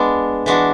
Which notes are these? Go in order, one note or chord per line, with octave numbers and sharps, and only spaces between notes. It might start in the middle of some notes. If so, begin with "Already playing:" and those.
Already playing: G#3 B3 D4
E3 G#3 D4 F#4